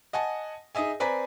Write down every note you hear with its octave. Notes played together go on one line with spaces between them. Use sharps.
D#5 F#5 G#5 A5
D#4 G#4 D#5 E5 G#5
C4 B4 D5 G#5 A#5 B6